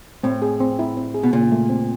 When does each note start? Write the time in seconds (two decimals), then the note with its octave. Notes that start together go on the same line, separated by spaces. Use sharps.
0.23 A2 C4
0.42 G#4
0.60 C4
0.79 E4
0.97 C4
1.14 G#4
1.23 B2
1.33 A#2 C#3
1.52 A3
1.69 C4